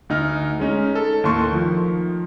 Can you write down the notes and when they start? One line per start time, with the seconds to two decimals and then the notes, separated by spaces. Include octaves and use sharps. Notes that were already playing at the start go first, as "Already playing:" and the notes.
0.09 D2 D#4 F6
0.60 G#3 C#4 D#4
0.95 A4
1.24 D#2 A2 A3 C6 C#6
1.52 D#3 F3